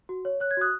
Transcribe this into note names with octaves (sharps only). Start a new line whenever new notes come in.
F#4
C#5
C#5 F#6
G#6
F#4 D#6 F#6